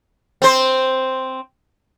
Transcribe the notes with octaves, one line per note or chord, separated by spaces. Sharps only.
C4 C5